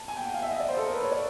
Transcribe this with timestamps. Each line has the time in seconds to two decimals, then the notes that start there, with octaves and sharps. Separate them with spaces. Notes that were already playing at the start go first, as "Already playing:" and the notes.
Already playing: A5
0.08 G#5
0.17 G5
0.25 F#5
0.34 F5
0.42 E5
0.51 D#5
0.60 D5
0.68 C5
0.77 A4
0.86 A#4
0.94 B4
1.03 C#5
1.12 D5